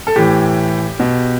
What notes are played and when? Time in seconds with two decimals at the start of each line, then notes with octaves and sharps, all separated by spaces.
0.07 A4
0.16 A2 E3 G4
1.00 B2